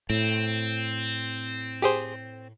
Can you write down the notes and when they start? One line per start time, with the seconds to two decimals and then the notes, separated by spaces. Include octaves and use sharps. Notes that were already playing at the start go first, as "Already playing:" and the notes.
0.10 A2 C4
1.82 G4 G#4 C5